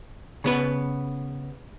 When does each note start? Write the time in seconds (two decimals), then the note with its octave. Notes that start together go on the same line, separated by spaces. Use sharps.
0.44 C#3 B3 B4